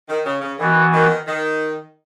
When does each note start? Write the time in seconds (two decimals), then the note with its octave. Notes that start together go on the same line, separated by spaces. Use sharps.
0.08 D#3
0.25 C#3
0.41 C#3
0.58 D#3 E3 B3 F#4
0.93 D#3
1.27 D#3